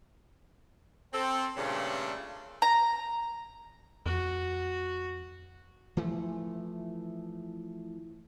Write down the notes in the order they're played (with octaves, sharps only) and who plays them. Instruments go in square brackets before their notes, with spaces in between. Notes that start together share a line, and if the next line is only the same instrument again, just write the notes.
[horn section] C4 A4
G2 A#2 C#3 G3 A3 D4
[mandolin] A#5
[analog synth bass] F2 [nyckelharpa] F#4
[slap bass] E3 F3 A3